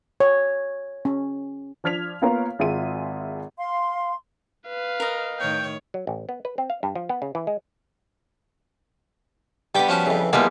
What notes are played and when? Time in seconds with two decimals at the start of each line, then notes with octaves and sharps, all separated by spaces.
0.20 C#5
1.05 C#4
1.84 F3 D4 F6 G#6 B6 F7
2.22 A#3 B3 F4 A#4 C#5 F5
2.59 G#1 F4 G#4 E5 D#7
3.57 F5 C6
4.67 B4 F5
5.00 A#4 D#5
5.40 A2 D#3 C#5 G5
5.94 F#3
6.07 A1
6.29 B3
6.45 B4
6.58 C4
6.70 F5
6.83 G2
6.95 F3
7.09 B3
7.22 C#3
7.35 E3
7.47 G#3
9.75 G2 G3 B3 G5 D6
9.89 F3 C#4 F#4
10.06 F2 C#3 E3
10.33 E2 F3 G3 G#3 A#3 B3